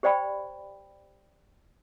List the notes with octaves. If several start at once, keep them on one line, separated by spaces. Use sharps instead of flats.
G4 C5 D5 G5 B5